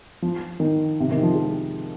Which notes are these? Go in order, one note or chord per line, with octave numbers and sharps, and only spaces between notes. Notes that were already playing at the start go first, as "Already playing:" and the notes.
F3
D#3
C3
D#3
F3
G#3